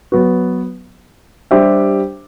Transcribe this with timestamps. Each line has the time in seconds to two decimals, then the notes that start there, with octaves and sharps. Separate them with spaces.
0.12 F#3 B3 F#4 B4
1.51 G3 D4 G4 C5 E5